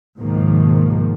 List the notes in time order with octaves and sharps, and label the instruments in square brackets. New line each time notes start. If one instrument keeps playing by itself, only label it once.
[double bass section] C#2 G#2 B2 D#3 F3 A#3